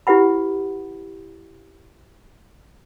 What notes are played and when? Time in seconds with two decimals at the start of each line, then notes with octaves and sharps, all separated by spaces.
0.07 E4 G4 B4 F#5 B5